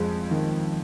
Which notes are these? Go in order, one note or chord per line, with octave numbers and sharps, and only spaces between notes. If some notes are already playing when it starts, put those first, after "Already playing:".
Already playing: F2 G#3
D#3